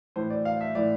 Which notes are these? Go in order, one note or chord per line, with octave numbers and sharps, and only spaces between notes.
A2 E3 C5
D5
F5
E5
A2 E3 D5